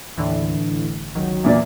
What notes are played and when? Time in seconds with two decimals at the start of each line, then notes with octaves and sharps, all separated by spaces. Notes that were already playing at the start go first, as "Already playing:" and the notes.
0.17 D#2 A2 D3 E3
0.71 G1
1.15 C#2 D#3 F#3
1.44 E2 A#2 D5